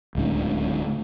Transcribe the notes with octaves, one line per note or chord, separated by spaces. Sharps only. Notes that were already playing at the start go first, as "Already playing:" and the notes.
D1 C#2 A2 D3